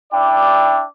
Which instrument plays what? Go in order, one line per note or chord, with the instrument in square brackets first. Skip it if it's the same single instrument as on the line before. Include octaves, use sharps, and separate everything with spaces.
[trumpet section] D4 E4 D5 E5 G5 D6